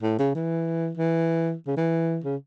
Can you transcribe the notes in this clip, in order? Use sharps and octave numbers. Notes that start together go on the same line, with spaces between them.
A2
C#3
E3
E3
C#3
E3
C#3